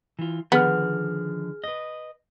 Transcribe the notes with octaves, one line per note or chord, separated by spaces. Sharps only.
E3 F4
D3 D#3 F3 B3 G#4 F6
B4 D#5